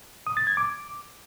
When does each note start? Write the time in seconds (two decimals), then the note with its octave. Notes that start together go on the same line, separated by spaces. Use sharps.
0.27 D#6
0.37 A6
0.47 G#6
0.57 D6